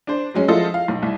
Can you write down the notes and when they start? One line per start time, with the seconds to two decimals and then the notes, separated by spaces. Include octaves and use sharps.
0.07 D4 C5
0.34 F#3 G#3 C#4
0.48 F3 G#3 E4 F4 A4 D#5
0.74 F5
0.88 B1
1.02 C2